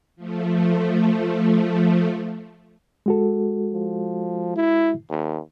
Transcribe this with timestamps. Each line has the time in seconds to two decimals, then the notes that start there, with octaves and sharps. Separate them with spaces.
0.16 F3 A3
3.06 G#3 F#4 A4
3.73 F3
4.56 E4
5.10 D#2